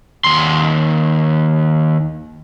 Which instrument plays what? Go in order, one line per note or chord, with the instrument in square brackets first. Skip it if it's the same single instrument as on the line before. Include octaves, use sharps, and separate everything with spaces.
[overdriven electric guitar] D#2 C6